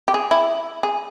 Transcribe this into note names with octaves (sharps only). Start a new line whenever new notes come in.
G4
G#4
E4
G#4